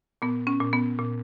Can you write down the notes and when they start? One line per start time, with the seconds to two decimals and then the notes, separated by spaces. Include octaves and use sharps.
0.22 A#2 B3
0.47 C#4
0.61 A#2
0.73 B3
0.99 A#2